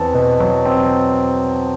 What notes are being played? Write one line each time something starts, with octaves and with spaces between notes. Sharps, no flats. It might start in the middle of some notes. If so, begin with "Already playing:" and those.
Already playing: E2 C4 A5
B2
F#3
C4